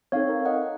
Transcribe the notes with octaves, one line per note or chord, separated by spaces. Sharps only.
C4 D#4 A4 C#5 F5
A#4
D#5 F#5